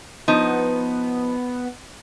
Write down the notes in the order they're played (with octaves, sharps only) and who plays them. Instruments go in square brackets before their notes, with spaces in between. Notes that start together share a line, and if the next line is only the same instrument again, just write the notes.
[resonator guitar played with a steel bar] F3 D#4 [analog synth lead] B3